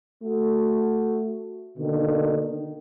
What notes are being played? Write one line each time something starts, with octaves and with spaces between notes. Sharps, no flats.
A3 F#4
B2 D3 D#3 A#3